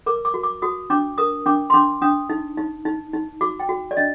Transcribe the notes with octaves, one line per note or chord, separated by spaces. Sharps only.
A#4 D6
D6
F#4
D6
F#4 D#6
D4 D6
A#4 D#6
D4 D6
C6
D4 D6
D4 D#6
D#4
D#4
D#4
D#4
F#4 D6
G5
F#4
D5
D4 D#5